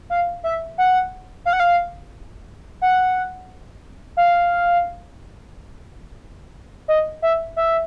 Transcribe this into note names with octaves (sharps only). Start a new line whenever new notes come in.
F5
E5
F#5
F5
F#5
F5
F#5
F5
D#5
E5
E5